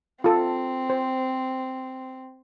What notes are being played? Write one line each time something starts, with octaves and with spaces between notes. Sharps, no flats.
C4 F4 A4
C5